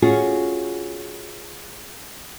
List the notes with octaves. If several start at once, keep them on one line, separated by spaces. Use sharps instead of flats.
C#4 F4 F#4 G#4